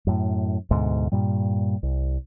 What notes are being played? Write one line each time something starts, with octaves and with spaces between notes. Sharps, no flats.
F#2 A2
D2 G#2 B2
G2 A#2 G3
C2